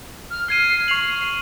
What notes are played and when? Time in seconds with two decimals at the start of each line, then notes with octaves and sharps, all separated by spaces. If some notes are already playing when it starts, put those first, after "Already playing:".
0.31 F6
0.48 F6 G#6 C7 D#7
0.88 C#6 F7 F#7